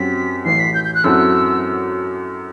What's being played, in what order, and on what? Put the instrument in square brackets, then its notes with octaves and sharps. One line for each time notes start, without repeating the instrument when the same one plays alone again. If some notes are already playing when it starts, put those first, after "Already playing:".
Already playing: [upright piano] F#2 F#3 C4 G4 [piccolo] B6
[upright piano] A1 A2 E3 [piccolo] C7
[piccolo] B6
G6
G6
F#6
[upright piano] F#2 F#3 C4 E4 A4 [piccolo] E6